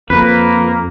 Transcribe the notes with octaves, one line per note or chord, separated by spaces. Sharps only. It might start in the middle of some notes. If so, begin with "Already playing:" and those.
F2 A#3 B4